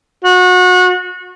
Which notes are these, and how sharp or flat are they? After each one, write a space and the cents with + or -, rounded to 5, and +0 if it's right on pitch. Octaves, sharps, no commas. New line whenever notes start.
F#4 -30